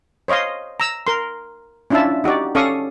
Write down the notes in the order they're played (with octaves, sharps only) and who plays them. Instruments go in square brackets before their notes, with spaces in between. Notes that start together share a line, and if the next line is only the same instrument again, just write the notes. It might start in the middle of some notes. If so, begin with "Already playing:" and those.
[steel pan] C5 C#5 D#5 F5 C6
A#5 E6
A#4 C6
C#4 D4 E4 F4 E5 A5
D#4 F#4 G4 D5
C#4 A4 D5 F5 C#6 D#6